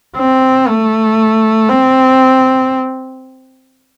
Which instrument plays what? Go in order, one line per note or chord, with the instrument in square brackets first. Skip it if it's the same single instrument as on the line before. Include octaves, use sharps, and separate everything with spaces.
[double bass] C4
A3
C4